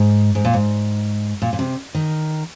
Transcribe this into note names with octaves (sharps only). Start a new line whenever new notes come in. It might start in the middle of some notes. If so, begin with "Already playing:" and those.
Already playing: G#2
G#2
A#2
G#2
A#2
A#2
C3
D#3